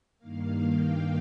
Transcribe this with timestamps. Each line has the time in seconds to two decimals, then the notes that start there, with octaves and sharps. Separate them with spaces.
0.18 G2 D#3 A#3 F5
0.62 G5